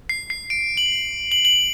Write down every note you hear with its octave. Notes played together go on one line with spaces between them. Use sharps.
C7
C7
D7
F#7
F#7
F#7